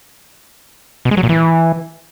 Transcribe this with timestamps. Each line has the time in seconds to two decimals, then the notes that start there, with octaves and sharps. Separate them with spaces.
1.05 B2
1.11 G#3
1.17 F#3
1.23 A#2
1.29 E3